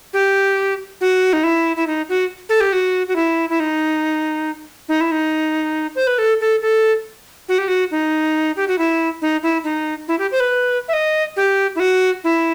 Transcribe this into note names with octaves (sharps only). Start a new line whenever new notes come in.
G4
F#4
D#4
E4
E4
D#4
F#4
A4
G4
F#4
F#4
E4
E4
D#4
D#4
E4
D#4
C5
B4
A4
A4
A4
F#4
G4
F#4
D#4
G4
F#4
E4
D#4
E4
D#4
E4
G4
C5
B4
E5
D#5
G4
E4
F#4
E4